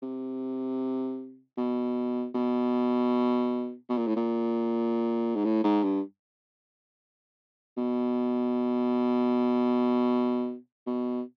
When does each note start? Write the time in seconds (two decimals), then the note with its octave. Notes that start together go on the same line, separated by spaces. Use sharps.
0.03 C3
1.57 B2
2.35 B2
3.89 B2
3.97 A#2
4.07 A2
4.16 A#2
5.35 G#2
5.44 A2
5.64 G#2
5.83 G2
7.77 B2
10.87 B2